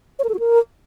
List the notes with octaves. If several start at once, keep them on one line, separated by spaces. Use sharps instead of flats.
C#5
A#4
A4
F#4
A#4